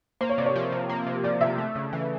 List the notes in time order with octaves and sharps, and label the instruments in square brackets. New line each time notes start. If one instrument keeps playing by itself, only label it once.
[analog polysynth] A#3 [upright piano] C5
[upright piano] C#5
[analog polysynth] C3 [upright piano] D5
[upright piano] C#5
[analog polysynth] F3
C3
A#3
C3
[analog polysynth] F3 [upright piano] D5
[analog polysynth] C3 [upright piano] E5
[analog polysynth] A3
C#3
E3